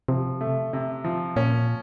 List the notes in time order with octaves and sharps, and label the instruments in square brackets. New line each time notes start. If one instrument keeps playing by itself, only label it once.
[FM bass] C3 [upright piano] F3
[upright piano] A3
C3
F3
[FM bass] A#2 [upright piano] C#4